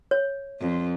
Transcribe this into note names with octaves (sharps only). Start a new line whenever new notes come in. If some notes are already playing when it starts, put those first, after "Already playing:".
C#5
F2